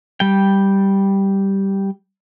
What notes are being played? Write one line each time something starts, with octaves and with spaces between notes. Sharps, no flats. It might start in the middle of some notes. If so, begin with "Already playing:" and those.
G3 G5